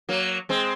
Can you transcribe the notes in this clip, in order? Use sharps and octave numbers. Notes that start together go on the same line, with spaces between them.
F#3 A#3
G#3 C4